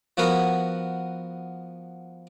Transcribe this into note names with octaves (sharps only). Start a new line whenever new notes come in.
F3 B3 F#4 A#4 B4